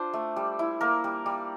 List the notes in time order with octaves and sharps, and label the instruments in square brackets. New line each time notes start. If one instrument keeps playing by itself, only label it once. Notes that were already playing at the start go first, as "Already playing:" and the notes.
Already playing: [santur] D4 F4 C5
A3
G3
E4
A#3 A#4
G3
G3